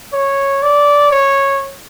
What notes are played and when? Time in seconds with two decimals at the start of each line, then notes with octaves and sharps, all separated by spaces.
0.13 C#5
0.63 D5
1.11 C#5